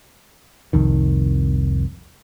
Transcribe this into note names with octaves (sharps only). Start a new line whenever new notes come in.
F1 C2 F2 D#3